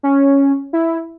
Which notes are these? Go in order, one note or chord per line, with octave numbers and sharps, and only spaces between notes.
C#4
E4